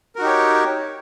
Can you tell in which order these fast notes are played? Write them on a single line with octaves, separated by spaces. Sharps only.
A#4 F#4 D#4 G4 C#5